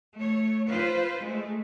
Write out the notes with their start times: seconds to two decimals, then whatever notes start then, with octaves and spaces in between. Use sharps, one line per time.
0.17 A3 C#5
0.68 F4 B4 C5
1.24 G#3 A3